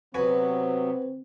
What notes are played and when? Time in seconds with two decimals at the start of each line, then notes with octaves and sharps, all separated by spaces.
0.14 C3 F#3 B3 C4 F#4 B4 G#5